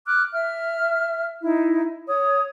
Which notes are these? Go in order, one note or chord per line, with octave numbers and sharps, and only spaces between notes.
D6 F6 F#6
E5 F6
D#4 E4
C#5 D#6